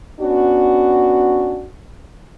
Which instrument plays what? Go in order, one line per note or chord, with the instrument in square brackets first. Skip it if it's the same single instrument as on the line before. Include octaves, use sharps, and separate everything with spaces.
[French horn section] B3 C#4 D4 F#4